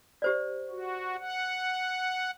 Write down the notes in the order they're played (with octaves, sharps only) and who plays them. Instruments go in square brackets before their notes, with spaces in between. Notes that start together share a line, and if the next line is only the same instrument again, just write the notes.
[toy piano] G4 C5 D5
[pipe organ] F#4
F#5